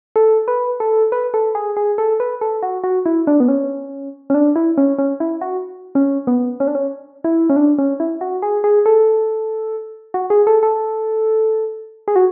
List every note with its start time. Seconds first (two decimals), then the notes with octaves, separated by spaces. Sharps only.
0.16 A4
0.48 B4
0.80 A4
1.12 B4
1.34 A4
1.55 G#4
1.77 G#4
1.98 A4
2.20 B4
2.41 A4
2.63 F#4
2.84 F#4
3.06 E4
3.27 D4
3.40 B3
3.48 C#4
4.30 C#4
4.34 D4
4.56 E4
4.78 C#4
4.99 C#4
5.20 E4
5.41 F#4
5.95 C#4
6.27 B3
6.60 C#4
6.67 D4
6.75 C#4
7.24 E4
7.50 C#4
7.56 D4
7.78 C#4
8.00 E4
8.21 F#4
8.42 G#4
8.64 G#4
8.86 A4
10.14 F#4
10.30 G#4
10.47 A4
10.63 A4
12.08 G#4
12.16 F#4